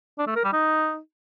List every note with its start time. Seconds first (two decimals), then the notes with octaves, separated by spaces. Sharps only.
0.18 D4
0.27 A3
0.36 A#4
0.44 G3
0.53 D#4